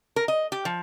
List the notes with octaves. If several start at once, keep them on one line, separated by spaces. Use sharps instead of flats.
A#4
D#5
G4
F3